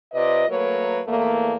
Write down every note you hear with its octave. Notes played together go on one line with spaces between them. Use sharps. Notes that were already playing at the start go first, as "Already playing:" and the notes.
C3 F4 B4 D5 D#5
F#3 A3 A#3 A#4 B4 C#5
E2 A3 A#3